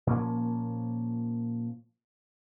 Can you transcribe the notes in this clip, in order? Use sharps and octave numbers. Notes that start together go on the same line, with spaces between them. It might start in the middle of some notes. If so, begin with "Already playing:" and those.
A#2 F3 A#3 C#4